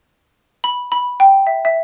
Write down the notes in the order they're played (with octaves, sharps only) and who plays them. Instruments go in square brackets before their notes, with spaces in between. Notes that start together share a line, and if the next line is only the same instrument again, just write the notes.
[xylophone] B5
B5
G5
E5
E5